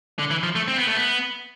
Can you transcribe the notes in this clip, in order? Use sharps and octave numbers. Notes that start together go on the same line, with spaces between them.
D3
E3
F3
A3
C4
B3
A3
B3